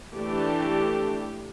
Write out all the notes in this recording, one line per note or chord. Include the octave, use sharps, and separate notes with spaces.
E3 A3 D4 G4